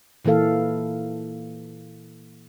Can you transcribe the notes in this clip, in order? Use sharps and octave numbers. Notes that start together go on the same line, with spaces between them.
A#2 E3 A#3 A4 F5